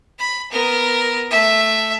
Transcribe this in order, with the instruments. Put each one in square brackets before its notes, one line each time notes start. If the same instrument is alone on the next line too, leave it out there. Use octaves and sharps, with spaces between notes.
[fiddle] B5
B3 A#4
A3 E5